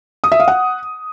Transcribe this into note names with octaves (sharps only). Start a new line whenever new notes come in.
D#6
E5
F5
F#5